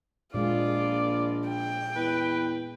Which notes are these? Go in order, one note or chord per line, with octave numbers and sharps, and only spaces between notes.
A#1 A#2 G#3 F4 G#4 D5
G5
E2 B4